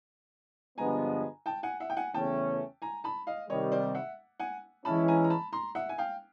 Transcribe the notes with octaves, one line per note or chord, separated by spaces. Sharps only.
G2 D3 F3 G#3 B3 G#5 A#5
G5 A5
F#5 G#5
E5 F#5
G5
F#5 G#5
E2 C#3 E3 A3 C#4 G5 A5
G#5 A#5
A5 B5
D#5 F5
C3 D#3 G3 C#5 D#5
C5 D5
E5 F#5
F#5 G#5
E3 G#3 C#4 E4 A5 B5
G#5 A#5
A#5
A5 B5
A#5 C6
E5 F#5
G#5
F5 G5